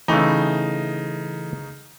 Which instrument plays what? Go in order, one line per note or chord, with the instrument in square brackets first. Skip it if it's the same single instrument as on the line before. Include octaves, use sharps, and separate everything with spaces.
[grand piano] C#3 D#4 [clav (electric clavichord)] E3 A3